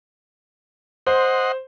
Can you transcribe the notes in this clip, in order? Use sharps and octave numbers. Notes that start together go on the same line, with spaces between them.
C5 D#5 F#5 C6